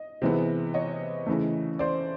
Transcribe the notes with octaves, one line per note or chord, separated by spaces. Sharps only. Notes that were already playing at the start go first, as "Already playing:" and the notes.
Already playing: D#5
C3 E3 G#3 B3
C#5 D#5
C#3 E3 A3
C5 D5